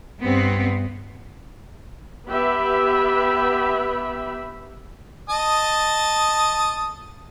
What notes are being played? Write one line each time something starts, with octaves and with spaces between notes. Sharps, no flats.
G2 B3 C4
B3 G4 B4 E5 B5
D#5 A5 D#6